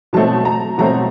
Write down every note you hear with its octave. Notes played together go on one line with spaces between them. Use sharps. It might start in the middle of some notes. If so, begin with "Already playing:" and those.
B2 F#3 A3 C4 A5
A#5
B2 F#3 A3 C4 A#5